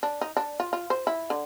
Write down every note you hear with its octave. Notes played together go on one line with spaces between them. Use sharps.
D4
D#4
D4
F4
F4
C5
E4
D3